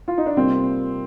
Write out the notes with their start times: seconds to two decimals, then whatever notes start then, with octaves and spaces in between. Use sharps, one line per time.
0.08 F4
0.18 D#4
0.26 D4
0.37 C3 G3 A#3 C4 F4